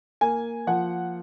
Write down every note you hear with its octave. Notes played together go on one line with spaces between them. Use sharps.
A#3 G#5
F3 F#5